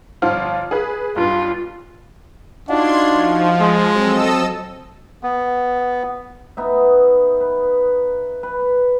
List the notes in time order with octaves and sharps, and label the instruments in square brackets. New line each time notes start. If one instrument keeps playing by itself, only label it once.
[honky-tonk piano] G1 F3 F4
G#4 B4
[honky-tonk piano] B1 G2 [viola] F4
[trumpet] D4 [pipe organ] D#4 F4 F#4 [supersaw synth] C6 G#6
[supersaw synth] F3
[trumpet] G#3
[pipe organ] F#3 C4 [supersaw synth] A4 D#5 E6
[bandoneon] B3
[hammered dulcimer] B3 D#4 E5
B4
B4